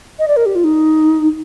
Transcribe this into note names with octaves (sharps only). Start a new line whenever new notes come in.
D#5
D5
A#4
G4
F4
D#4